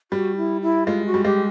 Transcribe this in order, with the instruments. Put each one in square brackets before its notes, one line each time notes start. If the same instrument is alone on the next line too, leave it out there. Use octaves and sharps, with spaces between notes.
[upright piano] G3 [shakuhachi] F#4
[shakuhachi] E4
E4
[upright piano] G#3 [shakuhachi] F4
[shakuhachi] F#4
[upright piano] G3
[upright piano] G#3 [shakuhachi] G4